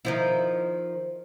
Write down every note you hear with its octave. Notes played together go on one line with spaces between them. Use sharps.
D#3 F3 E4